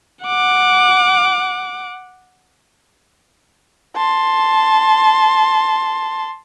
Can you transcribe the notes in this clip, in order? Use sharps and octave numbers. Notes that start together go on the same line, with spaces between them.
F#5 D6
A5 C6